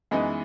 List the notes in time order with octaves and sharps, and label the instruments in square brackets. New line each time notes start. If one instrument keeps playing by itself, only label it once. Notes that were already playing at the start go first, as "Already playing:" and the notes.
[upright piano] F#2 E3 B3 D#4 [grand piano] G#3